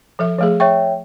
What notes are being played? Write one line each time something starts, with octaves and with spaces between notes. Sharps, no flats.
F3 A4 E5
F3 A3 G#4
C#5 E5 G5 C#6